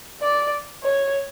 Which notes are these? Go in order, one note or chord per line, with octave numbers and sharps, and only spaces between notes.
D5
C#5